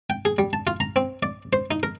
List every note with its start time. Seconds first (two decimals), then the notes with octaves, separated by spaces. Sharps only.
0.10 G5
0.25 G#4
0.38 G3
0.53 A5
0.67 F4
0.80 A#5
0.96 C4
1.23 D5
1.53 C5
1.71 D#4
1.83 A#4